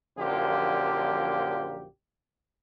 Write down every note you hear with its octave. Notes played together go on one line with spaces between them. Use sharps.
A#1 F#2 D3 F3 A#3 G4